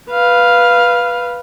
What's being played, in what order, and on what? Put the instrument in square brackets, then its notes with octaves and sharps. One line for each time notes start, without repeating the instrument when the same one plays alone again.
[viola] B4 F5